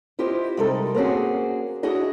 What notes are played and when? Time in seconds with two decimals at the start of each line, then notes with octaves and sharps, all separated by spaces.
0.19 E4 F4 G4 C5 D#5
0.57 C3 G3 G#3 D#4 A4 A#4
0.95 A#3 C4 C#4 F#4 G#4
1.83 D4 E4 F#4 G#4 D#5